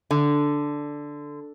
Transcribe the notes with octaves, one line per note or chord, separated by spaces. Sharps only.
D3